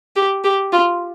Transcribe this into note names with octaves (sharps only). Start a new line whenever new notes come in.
G4
G4
F4